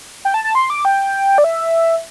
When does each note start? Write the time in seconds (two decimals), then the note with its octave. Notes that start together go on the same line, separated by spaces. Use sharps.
0.25 G5
0.34 A5
0.44 A5
0.55 C6
0.70 D6
0.85 G5
1.38 D5
1.44 E5